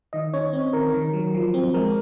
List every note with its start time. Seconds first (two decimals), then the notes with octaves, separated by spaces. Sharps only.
0.13 D#3 D#5
0.33 C#4 C#5
0.53 C4
0.73 D#3 A#4
0.94 D#3
1.13 F#3
1.34 F3
1.54 C4
1.74 G#3 A#4